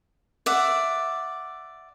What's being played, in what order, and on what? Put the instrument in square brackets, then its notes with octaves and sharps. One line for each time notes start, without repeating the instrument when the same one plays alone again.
[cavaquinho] D5 E5 F#5